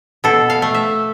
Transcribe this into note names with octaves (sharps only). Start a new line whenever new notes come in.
B2 A4
F5
A3
E5